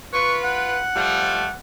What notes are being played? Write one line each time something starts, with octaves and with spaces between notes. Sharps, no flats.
F4 B4 C#6
F#5
F3 G3 A3